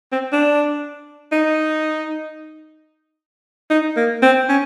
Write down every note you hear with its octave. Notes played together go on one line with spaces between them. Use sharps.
C4
D4
D#4
D#4
A#3
C4
C#4